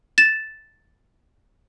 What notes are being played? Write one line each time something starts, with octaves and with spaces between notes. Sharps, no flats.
A6 E7